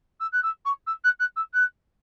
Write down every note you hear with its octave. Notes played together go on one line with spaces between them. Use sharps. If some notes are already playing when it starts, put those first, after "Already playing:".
E6
F#6
E6
C#6
E6
F#6
F#6
E6
F#6